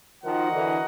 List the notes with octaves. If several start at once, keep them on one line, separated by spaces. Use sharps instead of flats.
D#3 F3 F#4 A#4 D#5 F#5
D3 E3